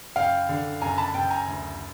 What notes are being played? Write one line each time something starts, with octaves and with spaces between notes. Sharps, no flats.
F#1 F5 G5
D3
F#1 G#5 A#5
A5 B5
F#1 G5 A5
G#5 A#5
D2